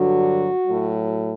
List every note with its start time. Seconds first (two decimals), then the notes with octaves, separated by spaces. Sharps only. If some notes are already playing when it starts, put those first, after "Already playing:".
Already playing: G2 D3 F#3 F#4
0.67 A2 F#3